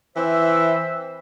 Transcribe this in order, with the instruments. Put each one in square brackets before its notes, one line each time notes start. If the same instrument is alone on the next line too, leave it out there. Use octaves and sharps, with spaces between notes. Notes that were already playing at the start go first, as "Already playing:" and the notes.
[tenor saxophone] E3 [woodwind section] C4 C5 E5